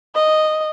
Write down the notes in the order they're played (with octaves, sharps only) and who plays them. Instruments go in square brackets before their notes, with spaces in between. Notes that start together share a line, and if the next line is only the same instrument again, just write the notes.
[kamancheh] D#5